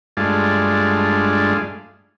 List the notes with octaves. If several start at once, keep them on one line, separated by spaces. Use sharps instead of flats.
G2 G#3 A3 D4 F4